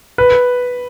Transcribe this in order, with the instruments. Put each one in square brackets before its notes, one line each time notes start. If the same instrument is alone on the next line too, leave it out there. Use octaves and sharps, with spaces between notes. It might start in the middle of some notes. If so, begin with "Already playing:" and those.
[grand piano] B4